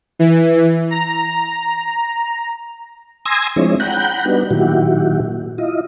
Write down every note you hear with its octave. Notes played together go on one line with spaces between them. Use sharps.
E3
A#5
G#5 C6 D#6 E6 G#6 A#6
F3 G#3 C4 D4 E4 C#5
F#5 G5 A#5 B5 F#6 G6
G3 B3 D4 D#4 F#4 B4
A#2 D#3 F#3 E4 F#4 G4
E4 F4 D#5